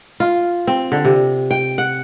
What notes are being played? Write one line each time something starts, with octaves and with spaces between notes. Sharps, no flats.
F4
C4
D3
C3
G5
F#5